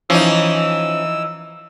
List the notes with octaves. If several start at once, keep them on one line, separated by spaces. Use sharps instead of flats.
E3 F3 C#4 D#4 E6